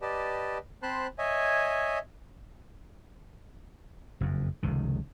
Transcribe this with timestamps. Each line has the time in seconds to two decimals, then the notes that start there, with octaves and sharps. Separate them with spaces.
0.02 G4 B4 D5 D#5 A5
0.83 C4 C5 A5 B5 C6 F#6
1.18 C#5 D#5 E5 G#5
4.21 F#1 F2
4.63 F1 C#2 D#3